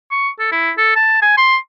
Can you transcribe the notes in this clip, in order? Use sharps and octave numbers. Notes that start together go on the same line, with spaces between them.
C#6
A4
E4
A4
A5
G#5
C6